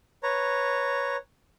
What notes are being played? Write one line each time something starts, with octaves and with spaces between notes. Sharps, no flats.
B4 C#5 A#5